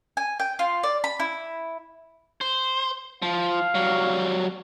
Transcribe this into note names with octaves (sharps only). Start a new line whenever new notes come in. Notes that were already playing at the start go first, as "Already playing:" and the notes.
G#5
G5
F4
D5
B5
E4
C5
F3 F5
F#3 G3